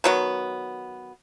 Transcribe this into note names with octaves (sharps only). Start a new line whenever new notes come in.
D#3 F#3 B3